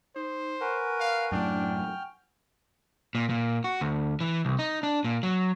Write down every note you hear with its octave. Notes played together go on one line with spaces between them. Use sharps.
D#4 C5
A#4 B4 F#5 G#5 C#6
F5
F#2 A2 D4 G5 F6
A#2
A#2
F#4
D2
E3
C2
D#4
D4
A#2
F#3